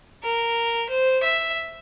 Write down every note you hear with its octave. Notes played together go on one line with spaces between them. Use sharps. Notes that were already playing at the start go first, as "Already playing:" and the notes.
A#4
C5
E5